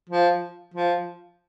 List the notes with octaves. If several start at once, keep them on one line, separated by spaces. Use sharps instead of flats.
F3
F3